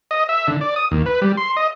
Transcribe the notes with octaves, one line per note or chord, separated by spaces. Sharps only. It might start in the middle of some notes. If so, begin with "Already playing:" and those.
D#5
E5
D3
D5
D#6
D#2
B4
G3
C6
D#5